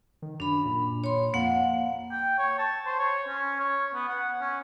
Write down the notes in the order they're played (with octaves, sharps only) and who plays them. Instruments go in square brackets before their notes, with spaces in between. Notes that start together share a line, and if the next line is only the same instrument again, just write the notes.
[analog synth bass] D#3
[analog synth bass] F#2 [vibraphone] D4 B5
[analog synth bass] A#2
[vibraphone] C#5 B5 C6
[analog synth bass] F2 [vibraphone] A#3 F5 F#5
[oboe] G5
C#5
A5
C5
C#5
C#4
C#5
B3
F#5
C#4